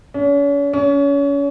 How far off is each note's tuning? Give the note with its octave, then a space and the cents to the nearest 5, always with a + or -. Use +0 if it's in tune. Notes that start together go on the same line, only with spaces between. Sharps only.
C#4 +40
C#4 +30